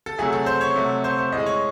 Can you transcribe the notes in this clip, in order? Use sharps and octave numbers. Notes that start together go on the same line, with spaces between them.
A4
C3 F#3 A3 G#4
A4
C5
C#5
C3 F#3 A3
C5
C5
A2 G#3 D#5
C#5